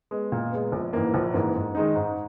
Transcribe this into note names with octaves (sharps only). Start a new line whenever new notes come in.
G#3 B3
A#2
G#3 B3
A#1
G#2 E3 A#3
A#1
G#2 E3 A#3
G#2
D#3 G#3 D#4
G#2